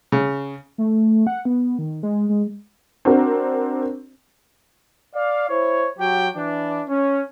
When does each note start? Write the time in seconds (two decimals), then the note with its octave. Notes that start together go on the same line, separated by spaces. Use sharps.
0.12 C#3
0.78 A3
1.27 F#5
1.45 B3
1.79 D#3
2.03 G#3
2.29 G#3
3.05 C4 D4 F#4 A#4
5.15 D5 F5
5.49 E4 C5 C#5
5.99 F#3 F#4 G4 G5
6.36 E3 D4
6.88 C#4